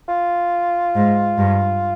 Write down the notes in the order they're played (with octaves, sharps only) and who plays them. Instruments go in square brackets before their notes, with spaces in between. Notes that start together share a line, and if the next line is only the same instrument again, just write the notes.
[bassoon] F4
[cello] G#2
G2